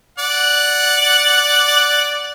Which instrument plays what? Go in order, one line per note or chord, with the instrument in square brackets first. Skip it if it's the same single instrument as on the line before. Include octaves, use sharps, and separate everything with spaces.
[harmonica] D5 F#5